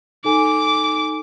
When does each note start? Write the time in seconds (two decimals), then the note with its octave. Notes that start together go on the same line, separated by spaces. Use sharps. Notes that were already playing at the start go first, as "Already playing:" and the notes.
0.24 D#4 A4 G#5 D6